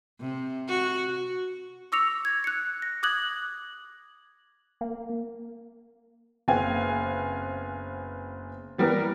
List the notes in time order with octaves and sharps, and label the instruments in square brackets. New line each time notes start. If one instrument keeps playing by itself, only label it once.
[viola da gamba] C3
F#4
[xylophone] C#6 D6 E6 A#6 C#7 F7
G#6
F#6 C#7
A#6
D6 D#6 F#6 G#6 F#7
[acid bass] A#3
[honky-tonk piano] F#1 B3 C4 F5 G#5
E3 G3 B3 A#4